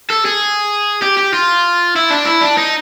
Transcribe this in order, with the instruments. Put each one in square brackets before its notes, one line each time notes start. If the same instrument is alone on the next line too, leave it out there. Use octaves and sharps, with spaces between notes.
[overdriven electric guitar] A4
G#4
G4
G4
F4
E4
D4
E4
D4
D#4